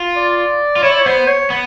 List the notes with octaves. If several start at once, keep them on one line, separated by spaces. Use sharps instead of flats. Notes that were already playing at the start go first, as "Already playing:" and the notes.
Already playing: F4
D5
F4
E4 C#5
D5
C#5
B3 C5
C#5
B3